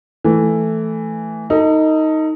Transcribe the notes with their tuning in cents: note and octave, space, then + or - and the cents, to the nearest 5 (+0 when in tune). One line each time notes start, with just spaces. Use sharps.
E3 +0 A3 +0
D#4 +10 A4 +40